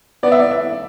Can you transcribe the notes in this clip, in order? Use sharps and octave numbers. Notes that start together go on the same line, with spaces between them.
B3 D5
E5
D5
E5